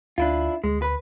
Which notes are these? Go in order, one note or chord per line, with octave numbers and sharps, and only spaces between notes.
D2 D4 E4 F4
D2 G#3
B4